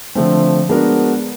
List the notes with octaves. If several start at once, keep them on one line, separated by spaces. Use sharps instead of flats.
D3 F3 A3 C4
G#3 B3 D4 F#4 A#4